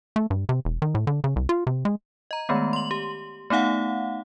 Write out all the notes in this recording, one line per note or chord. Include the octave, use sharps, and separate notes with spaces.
A3
G2
C3
E1
D#3
A2
D3
C#3
C2
F4
C3
G#3
D#5 A#5
D#3 G#3 A3 B3
C6 F#7
G4
A3 B3 D#4 F5 F#5